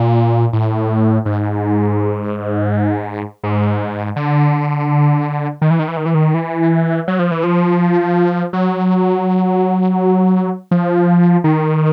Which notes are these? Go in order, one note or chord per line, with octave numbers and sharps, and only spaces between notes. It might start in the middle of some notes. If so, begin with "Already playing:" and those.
Already playing: A#2
A2
G#2
G#2
D3
D#3
E3
D#3
E3
D#3
E3
D#3
E3
F#3
F3
E3
F3
F#3
F3
D#3